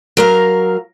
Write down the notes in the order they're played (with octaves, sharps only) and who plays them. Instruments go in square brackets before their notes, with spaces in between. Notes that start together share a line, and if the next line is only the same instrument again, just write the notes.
[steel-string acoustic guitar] F#3 A#4 F5